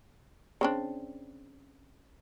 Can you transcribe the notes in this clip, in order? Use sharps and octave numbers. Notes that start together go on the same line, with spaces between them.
C#3 C4 D4